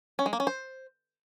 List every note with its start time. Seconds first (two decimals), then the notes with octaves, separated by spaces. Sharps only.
0.19 C#4
0.26 G#3
0.33 A#3
0.40 C#4
0.47 C5